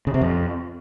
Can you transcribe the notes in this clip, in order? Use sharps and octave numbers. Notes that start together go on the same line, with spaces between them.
C#3
C3
F2